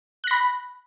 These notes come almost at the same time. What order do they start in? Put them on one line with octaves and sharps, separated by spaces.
F#6 A#6 B5